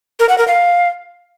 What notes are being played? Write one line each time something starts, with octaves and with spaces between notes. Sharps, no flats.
A#4
F#5
A#4
F5